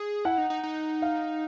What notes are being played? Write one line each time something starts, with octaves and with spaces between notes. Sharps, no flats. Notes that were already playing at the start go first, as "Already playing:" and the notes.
Already playing: G#4
E4 F#5
D#4
D#4
D#4
F5